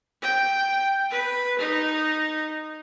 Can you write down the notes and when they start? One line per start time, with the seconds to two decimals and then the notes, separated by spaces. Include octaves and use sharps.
0.22 G5
1.11 B4
1.59 D#4